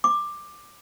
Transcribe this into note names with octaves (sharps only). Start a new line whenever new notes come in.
D6